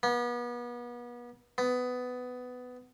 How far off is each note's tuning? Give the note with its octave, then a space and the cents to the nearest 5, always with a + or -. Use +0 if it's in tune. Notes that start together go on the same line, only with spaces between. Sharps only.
B3 -35
B3 +15